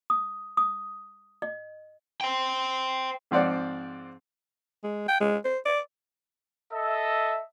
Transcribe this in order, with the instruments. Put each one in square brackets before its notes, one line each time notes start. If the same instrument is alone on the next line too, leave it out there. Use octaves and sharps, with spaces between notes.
[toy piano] D#6
D#6
D#5
[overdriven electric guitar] C5 G5
[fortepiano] G#2 F3 C4 D5 F#5
[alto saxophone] G#3
G5
G#3
C5
D5
[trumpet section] A4 D#5 E5